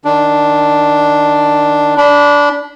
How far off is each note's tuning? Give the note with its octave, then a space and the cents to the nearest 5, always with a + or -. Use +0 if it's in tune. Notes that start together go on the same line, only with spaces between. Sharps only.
D#3 -15 D4 +0
D4 -15 B5 +0